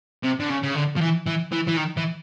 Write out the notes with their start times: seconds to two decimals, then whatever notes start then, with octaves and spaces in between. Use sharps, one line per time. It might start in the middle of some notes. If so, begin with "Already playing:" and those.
0.24 C3
0.40 D3
0.50 C#3
0.63 C#3
0.75 D3
0.96 F3
1.01 E3
1.27 E3
1.52 E3
1.68 E3
1.77 D#3
1.97 E3